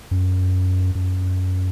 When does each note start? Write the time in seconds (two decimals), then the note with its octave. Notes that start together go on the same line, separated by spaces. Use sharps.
0.11 F#2
0.95 F#2